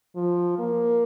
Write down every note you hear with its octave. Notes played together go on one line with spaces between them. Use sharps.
F3
A#3